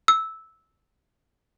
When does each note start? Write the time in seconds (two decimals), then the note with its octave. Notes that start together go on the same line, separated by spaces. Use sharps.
0.08 E6